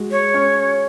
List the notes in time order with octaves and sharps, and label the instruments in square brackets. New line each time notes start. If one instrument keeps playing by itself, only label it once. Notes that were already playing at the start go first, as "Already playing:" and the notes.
Already playing: [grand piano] G#3 F#4
[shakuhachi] C#5
[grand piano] C#4